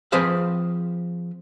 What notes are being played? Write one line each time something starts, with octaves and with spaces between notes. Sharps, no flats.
F3 C4 G#4 B4 C5 F5